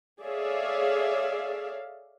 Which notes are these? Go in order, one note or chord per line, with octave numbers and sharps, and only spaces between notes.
G#4 A4 C#5 D5 E5 F5